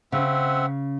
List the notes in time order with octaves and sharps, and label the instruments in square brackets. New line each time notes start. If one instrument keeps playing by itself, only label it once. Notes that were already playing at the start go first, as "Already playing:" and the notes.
[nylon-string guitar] C#3 [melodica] C4 E5 F#5